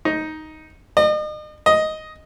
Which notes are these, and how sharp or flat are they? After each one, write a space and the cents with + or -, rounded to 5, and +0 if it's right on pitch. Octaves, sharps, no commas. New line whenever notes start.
D#4 +5
D#5 -40
D#5 +5